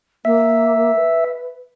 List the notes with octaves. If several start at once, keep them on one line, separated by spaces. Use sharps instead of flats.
A#3 E5
B4